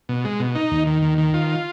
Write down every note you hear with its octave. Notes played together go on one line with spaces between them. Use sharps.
B2
G#3
B2
D#4
D#2
D#3
D#2
D#3
F4